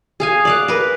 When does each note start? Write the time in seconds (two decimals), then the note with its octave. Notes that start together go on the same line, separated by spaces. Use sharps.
0.20 G#4 F5 G#5
0.45 D5 F5 F#5
0.68 A#4 B4